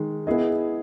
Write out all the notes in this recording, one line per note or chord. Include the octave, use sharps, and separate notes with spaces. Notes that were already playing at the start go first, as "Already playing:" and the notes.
Already playing: D#3 G#3
B3 E4 G#4 D#5